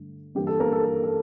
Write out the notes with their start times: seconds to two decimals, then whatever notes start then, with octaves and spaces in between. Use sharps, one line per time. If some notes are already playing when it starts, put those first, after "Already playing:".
Already playing: G2 D3 A3
0.35 G2 E3 A#3 G4
0.47 A4
0.60 A#3 A#4
0.72 A4
0.84 A4
1.03 A4